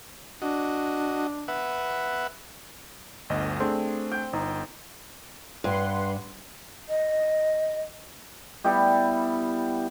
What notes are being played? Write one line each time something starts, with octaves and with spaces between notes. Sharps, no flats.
D4 F#4 D#5
B4 E5 F#5
G1 D2 D#5
A3 C4 D4 G#4
G5
G1 D#4
G2 B4 F#5 C6
D#5
G3 B3 E4 G4